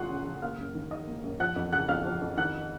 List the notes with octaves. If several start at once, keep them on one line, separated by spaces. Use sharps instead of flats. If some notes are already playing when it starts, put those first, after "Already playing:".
Already playing: C#3 A3 F4 F#5 C6 C#6 D#6 F#6
C#4
C#3
A#3 F5 F6
F#2
D#3
D#4 D#5 D#6
A#3
F#2
F3 F#5 F#6
F2
C#3 F#5 F#6
F2 F5 F6
F3
F2
D#3 F#5 F#6